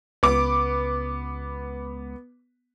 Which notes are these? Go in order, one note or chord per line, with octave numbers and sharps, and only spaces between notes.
C#2 B3 D6